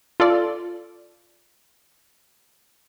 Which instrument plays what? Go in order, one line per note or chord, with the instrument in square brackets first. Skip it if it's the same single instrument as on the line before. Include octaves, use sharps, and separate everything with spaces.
[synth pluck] F4 A4 D5